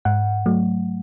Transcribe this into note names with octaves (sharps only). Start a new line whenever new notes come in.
G#2 F#5
F#3 A3